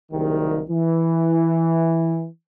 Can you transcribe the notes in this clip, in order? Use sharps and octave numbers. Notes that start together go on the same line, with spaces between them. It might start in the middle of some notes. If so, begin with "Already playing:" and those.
F#1 C2 D#3
E3